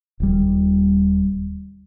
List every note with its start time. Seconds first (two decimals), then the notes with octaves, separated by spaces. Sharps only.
0.20 D#1 G3